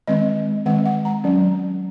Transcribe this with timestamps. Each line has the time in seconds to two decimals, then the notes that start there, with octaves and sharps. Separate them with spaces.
0.07 D#3 G#3 C4 D#5
0.65 D#3 G#3 C4 F#5
0.86 F#5
1.05 A#5
1.24 F#3 C#4